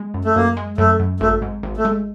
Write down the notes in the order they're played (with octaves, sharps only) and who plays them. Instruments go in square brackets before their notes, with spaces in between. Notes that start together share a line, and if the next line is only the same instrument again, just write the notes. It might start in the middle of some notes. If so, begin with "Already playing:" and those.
Already playing: [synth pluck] G#3
F#2
[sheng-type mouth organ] A3
[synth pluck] F#2 [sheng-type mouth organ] A#3
[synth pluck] G#3
[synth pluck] F#2 [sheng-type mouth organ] A3
[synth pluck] F#2
[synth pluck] G#1 [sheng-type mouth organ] A3
[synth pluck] G#2
G#1
[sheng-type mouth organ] A3
[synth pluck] G#3